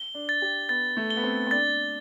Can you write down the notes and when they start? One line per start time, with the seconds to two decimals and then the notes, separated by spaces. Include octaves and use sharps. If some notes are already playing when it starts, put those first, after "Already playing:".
Already playing: G7
0.14 D4
0.29 A6
0.42 G4
0.69 B3 A6
0.97 A3
1.10 G7
1.17 B3
1.24 C4
1.47 C4
1.51 D4 A6